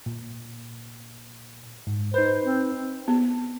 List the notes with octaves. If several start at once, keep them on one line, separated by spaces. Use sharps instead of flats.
A#2
G#2
D#4 B4 C5
C4
B3